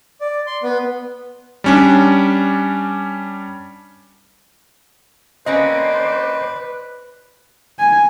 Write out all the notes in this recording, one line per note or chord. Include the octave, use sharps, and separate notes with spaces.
D5
C6
B3
G3 C#4 D4
A#3 C4 C#4 B4 C5 D5 D#5
G#5